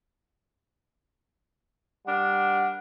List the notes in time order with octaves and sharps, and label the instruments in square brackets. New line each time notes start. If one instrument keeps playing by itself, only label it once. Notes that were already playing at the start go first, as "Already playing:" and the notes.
[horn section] G3 D4 A#4 F#5